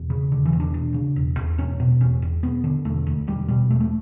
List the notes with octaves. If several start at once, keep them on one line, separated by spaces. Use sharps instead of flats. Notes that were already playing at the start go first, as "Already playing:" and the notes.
Already playing: E1
C#3
E1 D3
E3
E2
D4
E1
C#3
E1
E2
E1 C#4
B2
E1 C#4
E2
E1 B3
D3
E1 A3
D2
E1 G3
B2 G3
E1 A3
A3